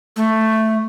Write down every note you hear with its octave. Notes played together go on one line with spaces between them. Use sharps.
A3